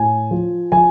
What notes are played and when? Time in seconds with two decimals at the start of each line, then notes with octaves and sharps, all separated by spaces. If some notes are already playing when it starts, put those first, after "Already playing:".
Already playing: A2 G#5
0.31 F3
0.72 F3 G#5